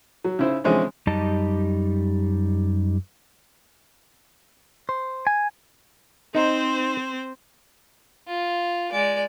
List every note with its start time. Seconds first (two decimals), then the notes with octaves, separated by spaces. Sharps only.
0.25 F#3
0.39 C#3 E4 C5
0.64 D3 E3 F3 G#3 C4 C#4
1.07 F#2 G3 D#4 G4 D#5 A5
4.89 C5
5.27 G#5
6.35 C4 D#4 C5
8.28 F4
8.92 G#3 D5